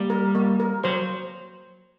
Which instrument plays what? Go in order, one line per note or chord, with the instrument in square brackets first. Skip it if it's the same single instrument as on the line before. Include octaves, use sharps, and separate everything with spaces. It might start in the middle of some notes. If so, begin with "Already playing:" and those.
Already playing: [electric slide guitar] G3 [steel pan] A#3
[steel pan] A#4
A#3
A#4
[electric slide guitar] F#3 [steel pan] C5